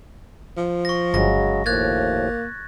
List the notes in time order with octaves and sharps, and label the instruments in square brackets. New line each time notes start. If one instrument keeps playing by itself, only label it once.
[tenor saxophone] F3
[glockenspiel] C#6 A#6
[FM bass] G1 [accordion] C#3 F#3 G#3 [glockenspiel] A#6
[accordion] D#2 A2 F3 [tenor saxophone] A#3 [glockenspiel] F#6 G#6 A6